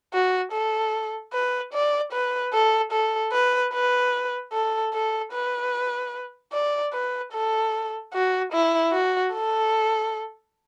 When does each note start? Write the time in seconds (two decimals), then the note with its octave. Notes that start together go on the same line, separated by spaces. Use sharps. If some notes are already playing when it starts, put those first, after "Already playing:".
0.13 F#4
0.52 A4
1.33 B4
1.73 D5
2.12 B4
2.53 A4
2.92 A4
3.32 B4
3.73 B4
4.53 A4
4.94 A4
5.33 B4
6.53 D5
6.93 B4
7.33 A4
8.14 F#4
8.53 E4
8.93 F#4
9.33 A4